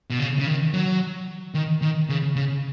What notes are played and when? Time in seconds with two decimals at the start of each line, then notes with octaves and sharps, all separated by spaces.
0.10 B2
0.19 C#3
0.39 C#3
0.47 D#3
0.73 F#3
1.54 D#3
1.82 D#3
2.09 C#3
2.36 C#3